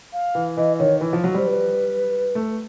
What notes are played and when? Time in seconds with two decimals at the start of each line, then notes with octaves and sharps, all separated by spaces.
0.12 F5
0.35 E3
0.56 E3 D#5
0.79 D#3 C#5
1.01 E3
1.13 F3
1.24 F#3
1.34 G3 C5
1.47 B4
2.35 A3